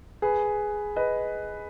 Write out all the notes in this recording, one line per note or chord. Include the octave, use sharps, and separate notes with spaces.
G#4 B4
B4 D#5